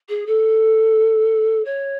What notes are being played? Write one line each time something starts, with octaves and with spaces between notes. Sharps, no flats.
G#4
A4
C#5